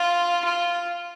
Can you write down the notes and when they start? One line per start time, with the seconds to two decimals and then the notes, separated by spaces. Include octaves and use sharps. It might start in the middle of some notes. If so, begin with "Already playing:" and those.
Already playing: F4
0.44 F4